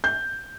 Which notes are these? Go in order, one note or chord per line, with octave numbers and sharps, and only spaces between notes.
G6